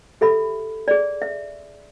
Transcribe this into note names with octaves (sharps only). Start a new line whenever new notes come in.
G4 A4 E5 B5
G#4 D5
E5